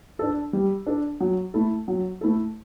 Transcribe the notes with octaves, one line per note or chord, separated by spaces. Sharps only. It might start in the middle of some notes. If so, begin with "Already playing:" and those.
D4 A4
G3
D4 A4
F#3
A3 E4 A4
F#3
A3 E4 A4